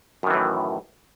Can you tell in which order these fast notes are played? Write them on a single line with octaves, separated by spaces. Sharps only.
F#2 D#3 E3 A2